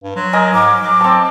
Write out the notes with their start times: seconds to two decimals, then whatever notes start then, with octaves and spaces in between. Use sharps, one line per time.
0.03 G2
0.16 F#3 C6
0.33 A#4 D#5 G#5
0.54 G#2 D6
0.82 F#3
1.01 C4 A5